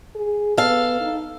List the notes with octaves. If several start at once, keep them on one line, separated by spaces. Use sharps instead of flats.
G#4
B3 A4 F5
D#4